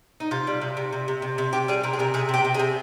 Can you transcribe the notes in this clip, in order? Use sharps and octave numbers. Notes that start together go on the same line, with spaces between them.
D#4
C3 F4
G3
C3
C3
C3
C3
C3
C3
C3 G4
G3 G#4
C3 A#4
G#4
C3 A#4
C3 G#4
C3 G4
C3
G#4
C3